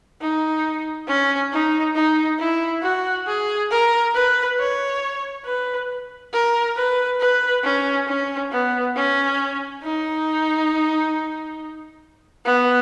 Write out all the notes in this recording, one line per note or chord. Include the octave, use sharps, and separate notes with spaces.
D#4
C#4
D#4
D#4
E4
F#4
G#4
A#4
B4
C#5
B4
A#4
B4
B4
C#4
C#4
B3
C#4
D#4
B3